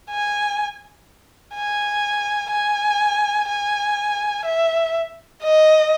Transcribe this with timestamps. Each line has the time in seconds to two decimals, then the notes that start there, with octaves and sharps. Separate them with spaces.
0.11 G#5
1.55 G#5
2.52 G#5
3.49 G#5
4.45 E5
5.43 D#5